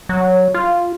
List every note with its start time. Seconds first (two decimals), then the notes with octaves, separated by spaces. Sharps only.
0.09 F#3
0.54 F4